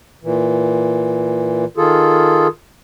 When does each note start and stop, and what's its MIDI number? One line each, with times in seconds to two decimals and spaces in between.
0.24 1.65 46
0.24 1.65 52
1.77 2.47 51
1.77 2.47 65
1.77 2.47 68
1.77 2.47 69